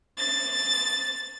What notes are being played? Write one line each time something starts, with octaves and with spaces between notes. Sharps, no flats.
A6